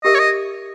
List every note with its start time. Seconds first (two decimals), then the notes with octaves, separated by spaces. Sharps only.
0.04 G4 A#4 D#5 E5
0.15 C#5
0.19 D#5